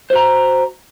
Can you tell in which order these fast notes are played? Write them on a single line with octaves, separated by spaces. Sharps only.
C5 F#4 A#5